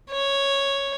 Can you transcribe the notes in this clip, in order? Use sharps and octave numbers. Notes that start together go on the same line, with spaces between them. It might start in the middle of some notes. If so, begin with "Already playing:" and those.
C#5